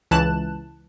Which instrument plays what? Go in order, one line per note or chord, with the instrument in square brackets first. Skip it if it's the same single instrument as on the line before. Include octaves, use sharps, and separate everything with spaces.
[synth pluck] C#2 E3 A5 F#6 E7